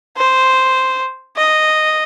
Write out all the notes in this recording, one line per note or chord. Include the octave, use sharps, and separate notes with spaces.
C5
D#5